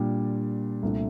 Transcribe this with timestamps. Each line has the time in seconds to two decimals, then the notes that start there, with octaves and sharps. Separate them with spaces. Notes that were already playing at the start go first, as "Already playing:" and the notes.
Already playing: A#2 G3 D4
0.83 C2 A#2 A3 D4